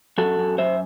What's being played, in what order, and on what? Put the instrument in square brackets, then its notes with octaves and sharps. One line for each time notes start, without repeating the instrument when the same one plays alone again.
[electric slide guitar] F#2 F#4 A4
F#2
F#2 C5 E5